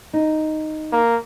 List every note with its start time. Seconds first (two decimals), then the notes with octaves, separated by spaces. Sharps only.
0.13 D#4
0.92 A#3